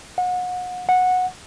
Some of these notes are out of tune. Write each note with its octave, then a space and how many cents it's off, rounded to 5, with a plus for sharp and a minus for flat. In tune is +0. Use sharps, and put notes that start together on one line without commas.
F#5 -35
F#5 -15